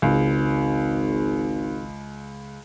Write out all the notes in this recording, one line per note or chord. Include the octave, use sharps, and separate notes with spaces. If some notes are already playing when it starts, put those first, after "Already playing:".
G#1 C#2